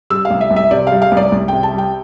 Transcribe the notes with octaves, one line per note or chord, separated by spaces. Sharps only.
G3 E6
F5
C2
E5
C2
E5
C3 D5
F5
G3
F5
C2
D5
C2
C3 G5
A5
G3 G5